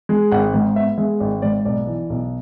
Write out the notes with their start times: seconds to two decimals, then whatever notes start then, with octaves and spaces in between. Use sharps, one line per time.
0.09 G#3
0.32 G#1 F#5
0.54 G#2
0.76 B3 E5
0.98 G#3 E5
1.20 G#1 D5
1.42 G#2 D5
1.65 B1 D5
1.87 E3
2.10 B1